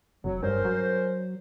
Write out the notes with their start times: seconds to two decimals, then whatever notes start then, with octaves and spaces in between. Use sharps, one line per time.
0.24 F1 F#3
0.43 G2 C#4 A#4 C5
0.65 F#3